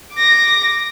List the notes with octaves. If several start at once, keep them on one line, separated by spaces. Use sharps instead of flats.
D6 A#6